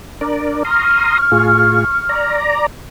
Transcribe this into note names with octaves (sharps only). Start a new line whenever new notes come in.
D4 A#4 D5
A#5 C6 C#6 D#6 F6
A2 F4 G#4
D5 A#5